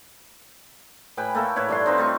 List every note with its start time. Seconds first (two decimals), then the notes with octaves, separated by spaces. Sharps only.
1.17 A2 B4 G5 G#5
1.35 A3 A#3 A4
1.56 A2 E4 B4 C#5
1.69 G2 D4 C6
1.86 C4 D#4 F4 B4
1.98 A3 F4 C#6